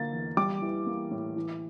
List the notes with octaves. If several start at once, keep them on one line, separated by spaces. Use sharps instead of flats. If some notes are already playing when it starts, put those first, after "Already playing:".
Already playing: D3 A#3 A6
E2
G3 D6
E3
A#3
A2
E3